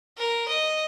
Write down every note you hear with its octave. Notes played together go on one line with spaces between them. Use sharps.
A#4
D#5